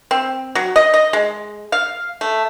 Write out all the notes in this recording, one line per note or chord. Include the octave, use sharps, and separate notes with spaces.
C4
F#3
D#5
D#5
G#3
F5
A3